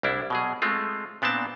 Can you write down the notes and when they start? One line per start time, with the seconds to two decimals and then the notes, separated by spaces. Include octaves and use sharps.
0.03 C2 G3 D4 E4
0.30 B2 F#3 G#4
0.62 G#3 A3 C4 F4
1.22 A#2 B3 C4 D4 A5